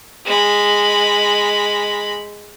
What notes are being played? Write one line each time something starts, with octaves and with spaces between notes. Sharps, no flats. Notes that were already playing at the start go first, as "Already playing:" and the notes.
G#3 B5